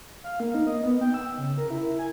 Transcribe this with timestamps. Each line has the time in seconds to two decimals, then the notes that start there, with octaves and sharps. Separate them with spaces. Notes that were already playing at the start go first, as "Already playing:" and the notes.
0.24 F5
0.40 A#3
0.55 D#4
0.67 D#5
0.84 B3
1.01 G5
1.14 E6
1.38 C#3
1.58 A#4
1.70 E4
1.99 G#5